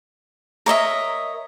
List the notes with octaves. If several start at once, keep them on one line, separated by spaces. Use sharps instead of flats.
A#4 C#5 D#5 E5